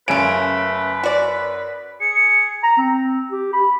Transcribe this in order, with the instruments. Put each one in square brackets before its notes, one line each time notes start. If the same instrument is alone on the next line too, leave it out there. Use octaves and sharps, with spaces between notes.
[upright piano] F#2 D7 [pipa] C#3 A3 [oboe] B4
[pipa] F#4 D5
[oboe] G#4 [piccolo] C#7
[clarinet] A#5
C4
G4
B5